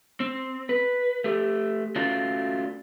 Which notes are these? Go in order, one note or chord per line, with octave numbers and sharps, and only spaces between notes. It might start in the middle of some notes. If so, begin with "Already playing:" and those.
C4
B4
A3 G4
A3 C#4 F4 F#4 D5